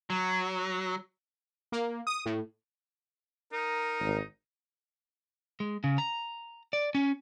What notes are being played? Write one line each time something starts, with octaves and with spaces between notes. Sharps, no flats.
F#3
A#3
D#6
A2
D#4 A#4
G#1
G#3
C#3
A#5
D5
C#4